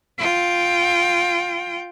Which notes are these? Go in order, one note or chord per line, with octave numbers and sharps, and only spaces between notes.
F4 G5